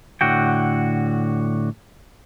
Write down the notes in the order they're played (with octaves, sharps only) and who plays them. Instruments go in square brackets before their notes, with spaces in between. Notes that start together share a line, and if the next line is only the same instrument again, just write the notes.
[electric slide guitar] A2 D3 F#4 G5